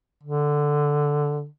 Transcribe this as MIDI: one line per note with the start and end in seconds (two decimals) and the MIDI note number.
0.24 1.46 50